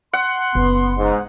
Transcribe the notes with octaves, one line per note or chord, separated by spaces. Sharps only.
F#5 C6
F#1 B3
G#2